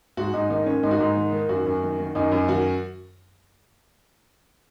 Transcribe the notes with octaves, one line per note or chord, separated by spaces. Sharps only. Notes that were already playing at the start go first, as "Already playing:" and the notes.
G#2 F#4
G#2 D#4
D#3 D#4
D#3 C#4
G#2 D#4
F#4
G#2 D#4
D#3
D#3
F#2 F#4
F#2
D#3
D#3
F#2 D#4
F#2
D#3 F#4